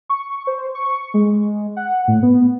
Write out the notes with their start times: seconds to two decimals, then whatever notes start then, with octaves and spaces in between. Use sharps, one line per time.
0.09 C#6
0.47 C5
0.75 C#6
1.14 G#3
1.76 F#5
2.08 A2
2.23 B3